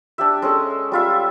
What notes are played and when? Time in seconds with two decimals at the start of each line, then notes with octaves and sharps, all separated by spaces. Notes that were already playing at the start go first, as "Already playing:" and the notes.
0.18 D4 G4 E5
0.42 G#3 C#4 A4
0.92 G3 F4 E5